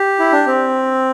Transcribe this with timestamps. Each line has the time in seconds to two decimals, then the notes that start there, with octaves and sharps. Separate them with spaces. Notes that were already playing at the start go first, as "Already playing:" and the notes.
Already playing: G4
0.20 E4
0.32 D4
0.46 C4